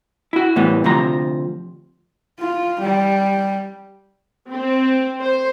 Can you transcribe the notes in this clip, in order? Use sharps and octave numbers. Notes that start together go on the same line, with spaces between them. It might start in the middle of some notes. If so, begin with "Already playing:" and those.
E4 F#4
A2 E3 G3 B3
D2 C3 F3 A#5
F4
G3
C4
C5